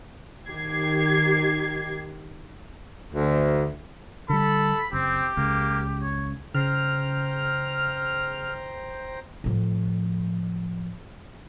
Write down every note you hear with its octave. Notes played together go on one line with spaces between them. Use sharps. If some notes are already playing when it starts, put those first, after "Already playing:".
D#3 G4 G#6 C7
D2
D3 G3 A4 B5
F#1 C4 G4
C#2 C#3 A#3
C#5
C#3 C5 G5 A#5 F6
A2 F3